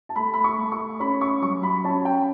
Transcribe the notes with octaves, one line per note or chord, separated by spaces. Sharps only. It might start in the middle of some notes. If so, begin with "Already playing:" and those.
A5
A3 B5
B5
C#6
A3
C#6
C#4 B5
C#6
F#3 C#6
B5
C#4 A5
G5